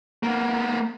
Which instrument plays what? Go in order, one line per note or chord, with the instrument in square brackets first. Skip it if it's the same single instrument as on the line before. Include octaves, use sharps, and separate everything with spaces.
[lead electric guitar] A#3 B3